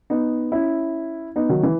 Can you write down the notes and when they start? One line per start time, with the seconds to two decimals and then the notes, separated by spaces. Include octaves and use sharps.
0.10 B3 D#4
0.52 C#4 E4
1.36 B3 D#4
1.49 D#3 F#3
1.63 E3